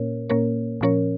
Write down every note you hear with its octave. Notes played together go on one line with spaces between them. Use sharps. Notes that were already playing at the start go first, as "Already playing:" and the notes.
Already playing: A#2 A#3 C#4 A#4 C#5
A#2 A#3 C#4 A#4 C#5
A#2 F3 C#4 A#4 C#5